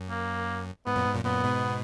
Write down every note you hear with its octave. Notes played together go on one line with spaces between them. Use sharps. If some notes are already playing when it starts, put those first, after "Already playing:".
Already playing: F#2
A#3
G#2 B3
F#2 A#2
G#2
F#2 A#2
F#2 A#2 B3
G#2 B2